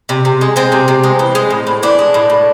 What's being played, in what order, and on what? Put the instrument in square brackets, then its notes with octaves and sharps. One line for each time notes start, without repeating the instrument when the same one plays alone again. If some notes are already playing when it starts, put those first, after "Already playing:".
[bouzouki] C3
C3
G#3
G#3 C4
C3
C3
G#3
E3
G#3
A2
A2
E3 D4
G#3
A2
A2